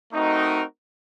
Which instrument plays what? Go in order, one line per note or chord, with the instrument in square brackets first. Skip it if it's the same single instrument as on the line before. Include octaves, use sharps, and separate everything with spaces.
[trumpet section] A3 C4 D#4 F#4 A#4